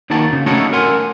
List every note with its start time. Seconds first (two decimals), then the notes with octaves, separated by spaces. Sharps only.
0.10 D#2 D#3 F#4 A5
0.33 C#3
0.46 A3 C#4 D#4 E4 F#4 A4
0.73 A#4 F#5 G#5 C6